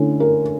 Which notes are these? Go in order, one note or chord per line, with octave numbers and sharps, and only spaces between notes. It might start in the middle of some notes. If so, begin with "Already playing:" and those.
Already playing: D3 A3 C#4 E4
A#4